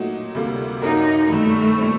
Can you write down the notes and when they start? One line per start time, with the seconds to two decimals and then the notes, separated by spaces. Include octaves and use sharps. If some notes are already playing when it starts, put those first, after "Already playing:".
Already playing: A#2 F#3 A3 D#4 F#4
0.35 D2 C3 G3 A#3
0.82 F#2 F#3 A#3 D#4 F#4 A#4
1.29 G2 D#3 G3 A3
1.78 A#2 G3 C4